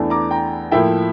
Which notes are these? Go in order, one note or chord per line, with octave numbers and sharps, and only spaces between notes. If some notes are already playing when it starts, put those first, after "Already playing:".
Already playing: E2 E3 A3 D4
A#5 D6
G5 A#5
A2 F3 A#3 E4 E5 G5